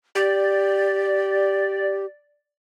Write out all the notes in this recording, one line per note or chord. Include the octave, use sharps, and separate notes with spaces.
G4 D5